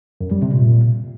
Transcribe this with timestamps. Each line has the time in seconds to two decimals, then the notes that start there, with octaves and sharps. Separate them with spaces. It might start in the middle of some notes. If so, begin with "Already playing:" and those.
0.21 F#2
0.31 G3
0.42 C3
0.53 A#2